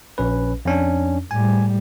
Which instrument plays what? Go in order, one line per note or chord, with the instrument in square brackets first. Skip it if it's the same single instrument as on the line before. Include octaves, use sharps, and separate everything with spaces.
[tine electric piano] A#1 C#4 B4
F2 C#4 D4
[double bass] A2 G3 [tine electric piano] G#5